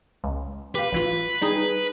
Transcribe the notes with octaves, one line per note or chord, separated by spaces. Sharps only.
C#2
G4 B4 F5
A1 E3 F4
G3 D#4 G#4